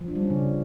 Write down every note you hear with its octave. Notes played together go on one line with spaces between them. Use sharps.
F3
D4
G3
C#4
C#3